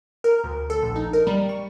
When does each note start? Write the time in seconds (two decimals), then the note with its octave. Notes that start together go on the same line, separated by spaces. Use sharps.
0.24 A#4
0.44 D2
0.70 A4
0.82 A#1
0.96 D#4
1.13 A#4
1.27 G3
1.49 C#6